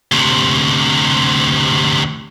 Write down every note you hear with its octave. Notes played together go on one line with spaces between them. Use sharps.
D2 C3